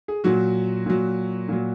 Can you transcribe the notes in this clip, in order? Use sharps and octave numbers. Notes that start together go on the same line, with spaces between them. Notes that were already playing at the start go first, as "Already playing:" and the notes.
G#4
A#2 F#3 F#4
A#2 F#3
A#2 F#3